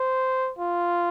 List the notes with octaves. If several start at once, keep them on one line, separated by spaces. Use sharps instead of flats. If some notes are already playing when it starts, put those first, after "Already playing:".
Already playing: C5
F4